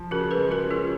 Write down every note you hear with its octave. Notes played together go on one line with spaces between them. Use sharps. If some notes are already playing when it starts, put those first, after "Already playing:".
Already playing: F3
C#3 F#4 A#4
G#4 B4
G#3
F#4 A#4
C#4
F4 G#4